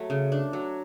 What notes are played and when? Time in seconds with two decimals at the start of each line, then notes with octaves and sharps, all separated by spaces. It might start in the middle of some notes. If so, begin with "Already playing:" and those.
Already playing: F#3 A3
0.10 C#3
0.32 D4
0.53 F#3